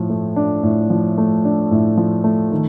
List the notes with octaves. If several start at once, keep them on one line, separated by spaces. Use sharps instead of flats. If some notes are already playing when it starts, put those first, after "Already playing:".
Already playing: A2 F3
A3
D4
A2
F3
A3
D4
A2
F3
A3
D#3